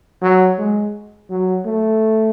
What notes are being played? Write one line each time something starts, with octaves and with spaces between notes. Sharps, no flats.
F#3
G#3
F#3
A3